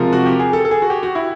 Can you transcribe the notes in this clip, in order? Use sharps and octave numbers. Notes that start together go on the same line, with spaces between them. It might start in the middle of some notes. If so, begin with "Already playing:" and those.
Already playing: C3 F3 G#3 A#4
F#4
G4
G#4
A4
A4
G#4
F#4
G4
F#4
E4